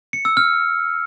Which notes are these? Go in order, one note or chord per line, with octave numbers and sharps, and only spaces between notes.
C#7
E6
F6